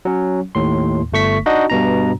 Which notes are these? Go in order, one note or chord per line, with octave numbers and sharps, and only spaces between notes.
F#3 C#4
D#2 A2 C6
G1 A3 C#6 B6
D4 D#4 F#4 D#5
G2 B2 A#5